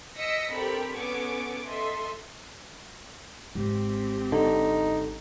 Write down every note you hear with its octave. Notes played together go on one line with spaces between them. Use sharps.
D#5 E6 A#6 B6 C#7 D7
C4 D4 G4 A4 A#4 B5
B3 C#4 G#4 A4 C#6 D6
A4 D#5 E5 C6
G#1 C4 G4
D3 D#4